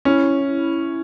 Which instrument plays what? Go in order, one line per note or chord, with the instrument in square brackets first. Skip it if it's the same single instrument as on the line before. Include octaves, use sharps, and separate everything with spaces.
[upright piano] C#4 [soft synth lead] E4